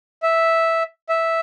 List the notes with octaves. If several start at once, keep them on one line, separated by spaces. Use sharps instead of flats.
E5
E5